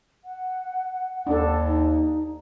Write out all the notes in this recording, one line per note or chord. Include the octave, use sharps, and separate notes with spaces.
F#5
D#2 D4 A4
D#4